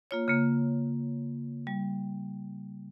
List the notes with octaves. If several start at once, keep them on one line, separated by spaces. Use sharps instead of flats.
A#3 F4 C#5
C#3 A#3
G3